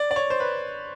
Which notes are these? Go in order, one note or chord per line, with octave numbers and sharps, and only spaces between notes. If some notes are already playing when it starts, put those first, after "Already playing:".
Already playing: D5
D5
C#5
C5
B4